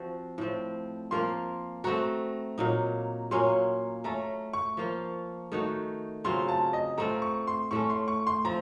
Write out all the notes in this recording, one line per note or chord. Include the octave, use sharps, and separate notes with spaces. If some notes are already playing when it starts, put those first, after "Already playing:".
Already playing: F3 C4 F#4
A2 F3 C4
F3 A#3 F4 A#4 C6
A3 C4 F#4 A#5
A#2 F#3 A#3 D#4
A#2 F#3 A#3 C#4 C6
A3 C#4 A4 A#5
C#6
F3 A#3 F4
D#3 A3 D#4 F#4
C#3 F#3 C4 F4 C6
A5
D#5
A3 C4 F4 A#5
C#6
C6
A2 A3 C#4 C#6
C6
C#6
C6
F3 C4 A#5